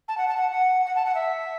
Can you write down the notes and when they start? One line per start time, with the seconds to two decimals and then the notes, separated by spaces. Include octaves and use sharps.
0.08 A5
0.17 F#5
0.28 A5
0.37 F#5
0.51 F#5
0.86 F#5
0.95 A5
1.05 F#5
1.15 E5